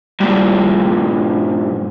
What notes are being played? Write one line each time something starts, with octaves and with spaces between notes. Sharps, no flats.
G2 A#2